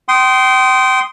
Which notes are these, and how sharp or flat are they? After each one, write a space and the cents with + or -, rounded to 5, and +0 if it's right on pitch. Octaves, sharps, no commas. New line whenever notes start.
G5 -30 C6 -5 D#6 +0